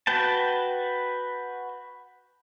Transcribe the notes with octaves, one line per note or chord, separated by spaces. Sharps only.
F#4 B4 G5 A5